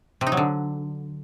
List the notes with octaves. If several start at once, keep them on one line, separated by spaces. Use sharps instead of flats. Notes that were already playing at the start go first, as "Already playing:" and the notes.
C3
D#4
F#3
D3